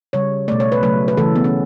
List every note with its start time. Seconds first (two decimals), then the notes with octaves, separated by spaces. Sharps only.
0.13 C#3 G3 C#5
0.48 A3 D5
0.52 B2
0.60 C#5
0.72 B4
0.83 C#3 F#3 A3 B4
1.08 B4
1.17 C#3 E3 A3 A4
1.36 B3
1.44 C#4